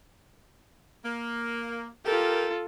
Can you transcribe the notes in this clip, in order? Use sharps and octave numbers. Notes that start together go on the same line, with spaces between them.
A#3
F4 G4 A4 A#4